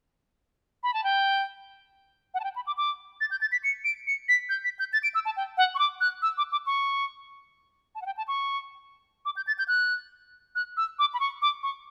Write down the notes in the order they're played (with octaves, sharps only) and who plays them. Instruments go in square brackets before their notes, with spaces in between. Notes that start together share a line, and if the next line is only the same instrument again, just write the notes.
[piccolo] B5
A5
G5
F#5
A5
G5
B5
D6
D6
A6
G6
A6
B6
C#7
D7
C#7
B6
G6
B6
G6
A6
D7
E6
A5
G5
F#5
C#6
D6
F#6
E6
D6
D6
C#6
A5
F#5
G5
A5
C#6
D6
G6
A6
G6
F#6
F#6
E6
D6
B5
C#6
D6
C#6